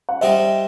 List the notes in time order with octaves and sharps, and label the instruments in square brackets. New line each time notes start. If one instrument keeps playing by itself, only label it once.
[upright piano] F#5
[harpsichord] G3 D#4 G4 C5 [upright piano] E5